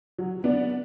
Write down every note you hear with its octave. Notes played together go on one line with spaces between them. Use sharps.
F#3
B3 D4